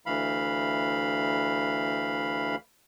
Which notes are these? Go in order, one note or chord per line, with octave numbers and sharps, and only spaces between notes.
D2 E3 F5 B5